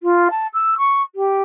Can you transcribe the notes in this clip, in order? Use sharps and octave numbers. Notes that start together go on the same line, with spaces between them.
F4
A5
E6
C#6
G4